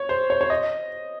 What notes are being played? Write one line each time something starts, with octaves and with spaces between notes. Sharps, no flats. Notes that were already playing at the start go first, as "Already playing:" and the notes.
Already playing: C#5
C5
C#5
C#5
D#5